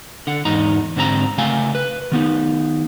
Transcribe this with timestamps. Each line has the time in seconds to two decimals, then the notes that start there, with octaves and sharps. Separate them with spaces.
0.27 D3 F#5
0.45 E2 G#2 D#4 A#5
0.96 G#2 D3 C4 G4 A#5
1.38 C#3 A3 F5 G#5
1.75 B4
2.12 D#3 B3 D#4